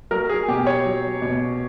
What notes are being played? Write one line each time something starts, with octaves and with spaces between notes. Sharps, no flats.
F#3 A#4
G#4
B2 G4
C#5
F#3
B2